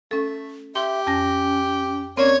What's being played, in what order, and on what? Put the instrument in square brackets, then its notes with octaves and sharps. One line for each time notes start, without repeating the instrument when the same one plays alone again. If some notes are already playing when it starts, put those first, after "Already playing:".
[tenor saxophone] A3 [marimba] C#4 A4
[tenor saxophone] G4 [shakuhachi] E5 [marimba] C6
[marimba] F2 G#5 A#6 [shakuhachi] C#4
[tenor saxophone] A#3 [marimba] C4 C#4 [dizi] C#5 [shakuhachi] D5